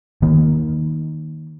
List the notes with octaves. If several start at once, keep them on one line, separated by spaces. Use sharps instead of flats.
D#3 A#3